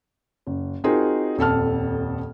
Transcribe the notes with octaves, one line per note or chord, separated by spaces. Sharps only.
F#1
C4 D#4 F4 F#4 G#4 A#4
D#1 F2 A4 A5 F6